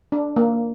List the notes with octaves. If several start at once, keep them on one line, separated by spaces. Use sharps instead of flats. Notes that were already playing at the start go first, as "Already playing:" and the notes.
D4
A#3